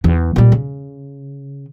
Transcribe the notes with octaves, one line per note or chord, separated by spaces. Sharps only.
E2 E3
A#2 G3
C#3